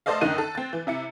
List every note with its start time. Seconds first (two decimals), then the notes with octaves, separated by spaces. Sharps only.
0.06 A3 A4 C5 D5 D#5 F5
0.21 F#2 D3 D#3 D#4 F#6 D#7
0.38 A4
0.55 C4 A6
0.73 E3
0.87 C3 E4 C#7